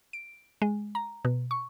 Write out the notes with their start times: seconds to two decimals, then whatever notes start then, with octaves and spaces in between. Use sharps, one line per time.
0.13 D7
0.62 G#3
0.95 A#5
1.25 B2
1.51 C#6